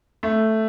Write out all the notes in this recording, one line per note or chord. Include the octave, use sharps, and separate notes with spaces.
A3